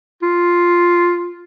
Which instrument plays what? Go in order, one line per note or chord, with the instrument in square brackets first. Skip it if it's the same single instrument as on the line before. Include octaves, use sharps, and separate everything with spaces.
[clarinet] F4